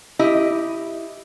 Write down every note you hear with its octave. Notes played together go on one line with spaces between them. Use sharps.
E4 G4 D#5